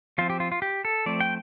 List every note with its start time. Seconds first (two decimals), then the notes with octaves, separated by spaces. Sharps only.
0.18 F3 C4 F4
0.30 G4
0.40 F4
0.52 F4
0.62 G4
0.85 A4
1.06 F3 A3 C4 D5
1.20 G5